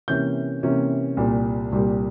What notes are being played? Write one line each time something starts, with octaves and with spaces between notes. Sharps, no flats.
C3 E3 A#3 C#4 G6
C3 E3 A#3 C#4
C2 A#2 G3
C2 A#2 G3